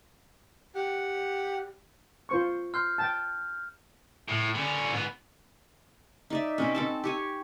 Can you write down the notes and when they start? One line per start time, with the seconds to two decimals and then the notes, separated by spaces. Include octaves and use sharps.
0.75 G4 F#5
2.29 F4 C5 C#6
2.74 C6 F6 G6
2.98 G5 A5
4.28 A2
4.55 D3 C#4
4.92 G#2 B3
6.30 D#4 D5 E5
6.58 B2 C4 C#4
6.75 C4 A4 A5
7.04 G4 C#5 G#5